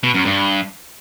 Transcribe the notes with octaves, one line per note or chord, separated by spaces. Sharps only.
B2
F#2
G2